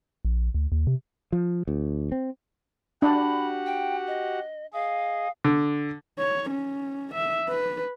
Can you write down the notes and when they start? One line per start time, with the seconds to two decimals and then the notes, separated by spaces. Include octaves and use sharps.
0.25 A#1
0.54 D2
0.72 D#2
0.87 C3
1.32 F3
1.67 D2
2.12 C4
3.02 D4 F#4 G4 F#5 B5
3.66 G5
4.07 D#5
4.73 G#4 D#5 F5
5.44 D3
6.19 C#5
6.51 C#4
7.15 E5
7.48 B4